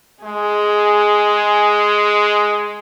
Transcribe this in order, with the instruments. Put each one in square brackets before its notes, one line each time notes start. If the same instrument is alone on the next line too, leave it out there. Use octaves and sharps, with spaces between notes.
[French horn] G#3 [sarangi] G#4